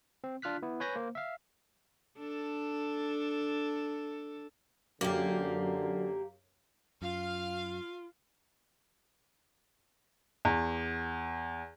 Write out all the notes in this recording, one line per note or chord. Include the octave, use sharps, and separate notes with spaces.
C4
D4 F4 F6 F#6 B6
B3 E4
B4 C#5 G#5 B5 G6 A#6
A#3 C5
E5 F5
D4 A4
F#2 D3 A#3 G4
F#2 F4 F5
E2